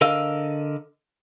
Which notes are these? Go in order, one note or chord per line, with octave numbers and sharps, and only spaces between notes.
D3 A#4 D#5 F5 E6